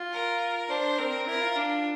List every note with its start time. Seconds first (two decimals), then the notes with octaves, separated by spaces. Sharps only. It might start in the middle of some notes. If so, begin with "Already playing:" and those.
Already playing: F4
0.13 A#4
0.69 D4 C5
0.98 C4 A#4
1.27 E4 A#4
1.41 F4
1.56 D4